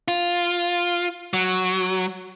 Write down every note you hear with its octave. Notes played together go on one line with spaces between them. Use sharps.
F4
F#3